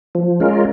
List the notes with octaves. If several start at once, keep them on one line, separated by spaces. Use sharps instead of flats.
F3
G#3 C#4 F4 A#4